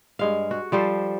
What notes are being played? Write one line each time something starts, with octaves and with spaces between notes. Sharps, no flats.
G2 G#3 F5
F#4
F3 G3 A4 C5